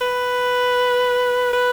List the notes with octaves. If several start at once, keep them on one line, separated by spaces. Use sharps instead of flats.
B4
B4